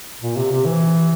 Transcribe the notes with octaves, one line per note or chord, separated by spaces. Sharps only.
A#2
C3
C3
E3